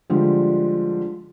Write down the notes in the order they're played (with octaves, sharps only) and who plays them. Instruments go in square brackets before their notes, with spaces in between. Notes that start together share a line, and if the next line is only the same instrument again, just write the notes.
[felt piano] D3 F3 G3 G#3